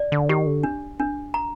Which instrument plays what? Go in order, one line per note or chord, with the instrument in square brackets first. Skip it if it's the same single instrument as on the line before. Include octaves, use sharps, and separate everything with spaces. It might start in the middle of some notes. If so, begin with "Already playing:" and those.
Already playing: [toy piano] D5
[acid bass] D3
[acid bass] D#3 [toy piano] G4
[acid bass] D3
[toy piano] D4
D4
A#5